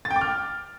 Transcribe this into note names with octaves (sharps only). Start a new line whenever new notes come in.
A6
G5
D6
F6